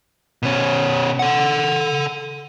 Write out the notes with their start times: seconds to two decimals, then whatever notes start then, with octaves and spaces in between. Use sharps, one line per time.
0.43 B2 C#4
1.19 A4 F#5